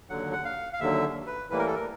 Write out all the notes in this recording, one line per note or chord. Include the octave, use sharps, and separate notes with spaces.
D#2 D3 F#3 F#5
F#5
F5
F5
D#2 D3 F#3 E5
B4
A2 E3 G3 A#3 B4
A#4
A4
A#4